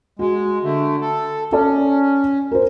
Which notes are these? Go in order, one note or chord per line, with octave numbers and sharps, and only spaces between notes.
G#3 F#4
D3 A3
A4
C#4 A4 D5 A5
A#4 C5